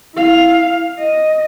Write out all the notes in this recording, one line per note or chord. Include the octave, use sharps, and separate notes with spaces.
E4 F5
D#5